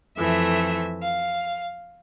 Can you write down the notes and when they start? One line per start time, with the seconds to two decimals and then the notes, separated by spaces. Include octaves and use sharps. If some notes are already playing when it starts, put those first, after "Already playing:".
0.17 F2 E3 A3 E5
1.03 F5